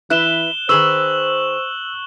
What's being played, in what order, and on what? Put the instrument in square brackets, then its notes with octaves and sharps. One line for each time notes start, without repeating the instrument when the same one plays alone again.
[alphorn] E3 [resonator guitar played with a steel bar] E4 B4 E5 [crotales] F#6 E7 G7
[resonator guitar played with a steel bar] D#3 G#4 B4 [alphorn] C5 [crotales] C#6 E7 F#7 [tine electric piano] E6